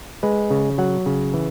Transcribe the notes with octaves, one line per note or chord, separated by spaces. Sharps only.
G#3 B4
C#3
F#3 F#5
C#3
E3